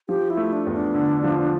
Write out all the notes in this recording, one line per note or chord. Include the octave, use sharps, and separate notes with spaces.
F3 G4
E4
A3
D4
E2
D4
D3
F3